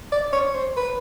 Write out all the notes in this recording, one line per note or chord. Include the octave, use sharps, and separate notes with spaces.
D5
C#5
C5
B4